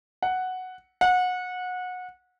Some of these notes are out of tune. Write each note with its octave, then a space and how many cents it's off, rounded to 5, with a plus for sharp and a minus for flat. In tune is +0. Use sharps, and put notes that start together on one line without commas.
F#5 +0
F#5 -25